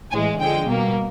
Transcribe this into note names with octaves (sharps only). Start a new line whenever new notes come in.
A2 E3 G#3 G#5
D3 F3 G#3 G5
B2 G3 A#3